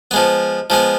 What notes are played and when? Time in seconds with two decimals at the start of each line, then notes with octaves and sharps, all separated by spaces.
0.11 F3 G#3 B3
0.70 F3 G#3 B3